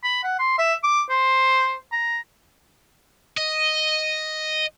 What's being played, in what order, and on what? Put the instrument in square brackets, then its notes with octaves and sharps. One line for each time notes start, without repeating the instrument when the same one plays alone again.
[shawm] B5
F#5
C6
E5
D6
C5
A#5
[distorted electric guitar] D#5